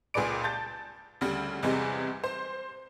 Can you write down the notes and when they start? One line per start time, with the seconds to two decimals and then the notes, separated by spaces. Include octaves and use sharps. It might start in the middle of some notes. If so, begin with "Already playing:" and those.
0.14 C#2 A#2 G#4 B4 D5 D7
0.43 A5 G6 A6
1.21 D2 C#3 G3
1.63 E2 C3 E3 G3 G#3
2.24 C5